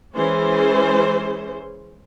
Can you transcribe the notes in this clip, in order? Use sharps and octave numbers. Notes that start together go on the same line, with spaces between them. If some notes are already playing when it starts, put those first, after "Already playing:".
E3 G#3 C#4 G#4 C5